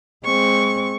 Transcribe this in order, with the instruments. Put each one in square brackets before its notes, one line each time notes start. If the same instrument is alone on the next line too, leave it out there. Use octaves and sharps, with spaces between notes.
[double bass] G#3 C4 [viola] C#6